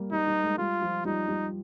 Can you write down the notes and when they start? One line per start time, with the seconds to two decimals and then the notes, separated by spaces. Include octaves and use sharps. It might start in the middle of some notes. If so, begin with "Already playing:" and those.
Already playing: G3 A#3
0.12 G3 D#4
0.28 G3
0.44 G#3
0.58 G3 F4
0.82 F3
1.05 G3 D#4
1.28 G3